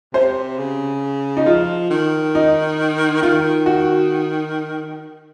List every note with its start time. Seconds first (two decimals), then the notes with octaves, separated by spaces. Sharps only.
0.14 C3 C5
0.58 C#3
1.37 D#4
1.46 F3 F4
1.90 D#3
2.35 D#4
3.22 D#3 F4
3.66 F#4